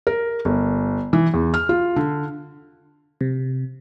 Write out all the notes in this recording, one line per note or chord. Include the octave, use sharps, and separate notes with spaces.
A#4
G1
E3
E2
F6
F4
D3
C3